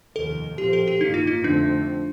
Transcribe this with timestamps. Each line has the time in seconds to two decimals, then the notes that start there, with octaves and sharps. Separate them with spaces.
0.16 F1 D#2 D#3 A4
0.58 A#1 A2 F3 C4 G4
0.73 A4
0.88 G4
1.01 A1 G2 D#3 A#3 D#4
1.14 F4
1.27 D#4
1.44 F2 D3 A3 C4 D4